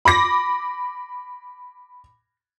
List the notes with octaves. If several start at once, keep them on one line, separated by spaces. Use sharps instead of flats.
B5 D6 A#6